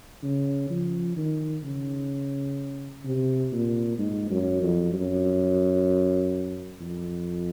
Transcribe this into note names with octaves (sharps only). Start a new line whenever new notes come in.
C#3
F3
D#3
C#3
C3
A#2
G#2
F#2
F2
F#2
F2